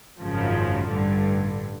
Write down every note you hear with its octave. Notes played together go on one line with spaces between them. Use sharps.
G#1 F#2 C#3 F3
A1 G2 D3